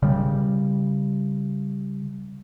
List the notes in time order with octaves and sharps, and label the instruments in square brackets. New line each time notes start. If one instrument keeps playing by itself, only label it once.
[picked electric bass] C#3 G3